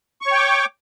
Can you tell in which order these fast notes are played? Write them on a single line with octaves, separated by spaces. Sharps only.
C#6 C#5 G5 D6